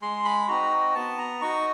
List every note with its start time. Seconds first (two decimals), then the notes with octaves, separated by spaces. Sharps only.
0.02 G#3 C6
0.25 B5
0.48 C4 D#4 F#4 A#5
0.95 B3 A5
1.18 A#5
1.41 D#4 F#4 C#6